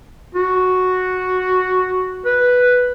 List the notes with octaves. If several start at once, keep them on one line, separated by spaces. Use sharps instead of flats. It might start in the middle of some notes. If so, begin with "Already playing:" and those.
F#4
B4